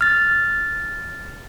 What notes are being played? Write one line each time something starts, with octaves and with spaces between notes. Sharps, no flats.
F6 A6